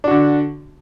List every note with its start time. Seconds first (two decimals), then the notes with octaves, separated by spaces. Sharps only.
0.04 D4
0.08 F#4
0.11 D3